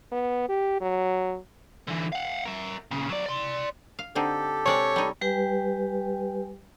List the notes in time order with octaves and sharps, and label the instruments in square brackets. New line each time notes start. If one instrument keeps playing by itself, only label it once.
[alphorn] B3
G4
F#3
[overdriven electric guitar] D3 E3
F5 F#5
A#4 E5
A#2 C#3
F#3 D5
D5 C6
[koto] F5
[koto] D3 C4 D#4 [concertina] G4 A4
[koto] C3 G#3 D5 [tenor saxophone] C#5
[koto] G3 D#4
[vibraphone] G3 G4 B4 G5 G#5